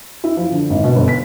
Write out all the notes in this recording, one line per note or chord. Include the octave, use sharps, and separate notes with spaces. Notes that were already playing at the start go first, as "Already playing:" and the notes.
E4
F3
D3
G#1
B2
G1
B6